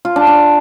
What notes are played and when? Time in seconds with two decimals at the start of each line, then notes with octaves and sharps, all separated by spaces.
0.05 F4
0.16 D4
0.27 D4